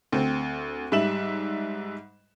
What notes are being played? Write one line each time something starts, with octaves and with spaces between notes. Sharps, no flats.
D2 C4
G#2 G3 E5 E7 F#7